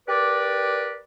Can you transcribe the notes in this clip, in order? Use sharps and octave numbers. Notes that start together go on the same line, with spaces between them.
G4 A#4 B4 D5